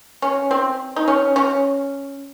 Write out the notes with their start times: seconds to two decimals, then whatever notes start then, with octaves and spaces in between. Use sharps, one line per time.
0.22 C#4
0.51 C4
0.96 D#4
1.08 C#4
1.36 C#4